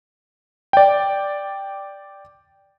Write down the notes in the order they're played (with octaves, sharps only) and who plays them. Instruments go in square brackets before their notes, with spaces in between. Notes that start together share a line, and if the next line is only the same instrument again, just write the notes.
[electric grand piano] D5 G5